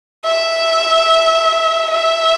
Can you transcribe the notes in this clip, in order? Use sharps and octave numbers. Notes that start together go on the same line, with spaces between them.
E5
E5